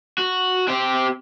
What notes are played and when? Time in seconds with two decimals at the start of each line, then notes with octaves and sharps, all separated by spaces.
0.18 F#4
0.68 C4 G4